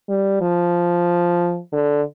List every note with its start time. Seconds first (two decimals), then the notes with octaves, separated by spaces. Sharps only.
0.09 G3
0.41 F3
1.72 D3